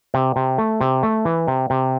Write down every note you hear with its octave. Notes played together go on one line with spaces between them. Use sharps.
C3
C3
A3
C3
A3
E3
C3
C3